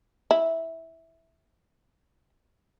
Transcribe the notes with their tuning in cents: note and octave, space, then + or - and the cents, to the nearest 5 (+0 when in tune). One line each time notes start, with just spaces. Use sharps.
E4 -10